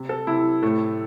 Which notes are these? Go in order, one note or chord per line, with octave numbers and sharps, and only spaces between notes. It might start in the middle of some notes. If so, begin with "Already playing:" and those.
Already playing: C3
A4
C3 E4
A2 A3